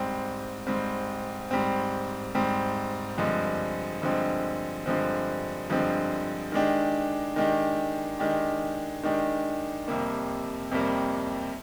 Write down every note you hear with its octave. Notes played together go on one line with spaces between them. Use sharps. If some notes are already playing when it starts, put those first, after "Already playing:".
Already playing: G#2 G3 C4
G#2 G3 C4
G#2 G3 C4
G#2 G3 C4
G2 D3 F3 G#3 C4
G2 D3 F3 G#3 C4
G2 D3 F3 G#3 C4
G2 D3 F3 G#3 C4
D#3 G#3 D4 G4
D#3 G#3 D4 G4
D#3 G#3 D4 G4
D#3 G#3 D4 G4
F2 C3 G3 A#3
F2 C3 G3 A#3